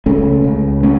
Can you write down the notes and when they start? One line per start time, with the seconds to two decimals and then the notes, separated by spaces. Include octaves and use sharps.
0.06 C#2 C#3 A3 C#4
0.44 C#2 C#3
0.83 C#3 A3 C#4